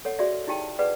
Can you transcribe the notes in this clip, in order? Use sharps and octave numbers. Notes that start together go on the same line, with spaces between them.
A4 C#5 F#5
F#4 G#4 D5 E5
D#4 E4 G4 G5 A5
G#4 B4 D5 F#5